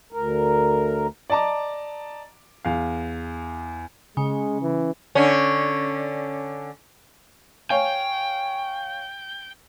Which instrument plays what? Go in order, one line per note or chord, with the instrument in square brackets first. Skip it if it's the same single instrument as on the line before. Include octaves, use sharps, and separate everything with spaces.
[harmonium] D2 A#4
[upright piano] D5 D#5 A5 A#5 D6
E2 F5
[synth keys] C#3 [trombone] G#3 [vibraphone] C#4
[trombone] E3
[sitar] D3 C#4
[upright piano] C#5 F5 G#5 [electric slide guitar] G5